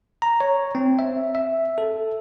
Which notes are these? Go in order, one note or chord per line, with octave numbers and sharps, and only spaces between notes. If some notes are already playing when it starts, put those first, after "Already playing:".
A#5
C#5
C4
E5
E5
A4